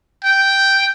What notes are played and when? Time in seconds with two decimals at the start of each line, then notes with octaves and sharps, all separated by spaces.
0.24 G5